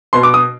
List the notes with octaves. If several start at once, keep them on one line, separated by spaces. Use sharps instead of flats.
B2 B3 C6
D6
D#6